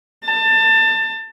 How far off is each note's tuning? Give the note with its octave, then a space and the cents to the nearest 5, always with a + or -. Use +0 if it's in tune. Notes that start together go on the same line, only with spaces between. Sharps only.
A5 +25